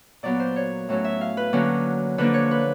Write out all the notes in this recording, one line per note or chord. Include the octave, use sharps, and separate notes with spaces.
A#2 F#3 B3 D5
C5
C#5
A2 F#3 A3 C#4
E5
F5
B4
D3 F#3 A#3 C#4
D3 F3 A#3 D4 B4
C#5
B4